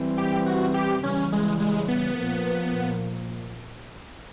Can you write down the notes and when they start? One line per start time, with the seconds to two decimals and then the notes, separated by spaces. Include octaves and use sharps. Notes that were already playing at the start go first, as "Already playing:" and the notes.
Already playing: E3 G3 C4
0.18 G4
0.46 F#4
0.74 G4
1.03 C#3 E3 G3 C#4
1.32 G#3
1.60 G#3
1.88 B3
2.18 A#2 F3 A#3